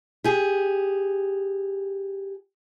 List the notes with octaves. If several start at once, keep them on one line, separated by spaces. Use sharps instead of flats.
G4 G#4